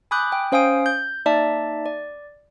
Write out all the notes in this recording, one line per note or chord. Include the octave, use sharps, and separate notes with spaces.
G#5 B5 D6 D#6 F#6 G6
G5
C#4 C5 F5 G#5 D#6 D7
G6
A#3 D#4 D5 E5 A5
D5